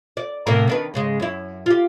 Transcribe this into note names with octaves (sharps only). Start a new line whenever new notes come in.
D5
A2 C3 A#3
D#3 D4 B4
G#2 C#3 G#3
F#2 E4
F4 G4